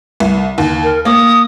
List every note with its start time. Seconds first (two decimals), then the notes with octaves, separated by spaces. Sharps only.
0.20 C2
0.58 D#2
0.83 A#4
1.05 A#3 D#6